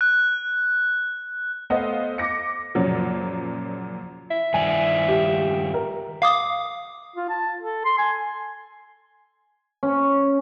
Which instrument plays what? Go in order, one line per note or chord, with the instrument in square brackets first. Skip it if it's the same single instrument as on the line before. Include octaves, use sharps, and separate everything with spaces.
[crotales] F#6
[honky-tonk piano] A3 B3 A4 C5 D#5 F5
D6 A#6 C#7
F#2 A#2 C#3 F3 F#3
[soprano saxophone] E5
[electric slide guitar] G2 D#3 D5 [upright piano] G#5
[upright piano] G4
A#4
[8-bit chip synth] F5 D6 D#6
[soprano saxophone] F4
A5
A4
C6
G#5
[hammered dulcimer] C#4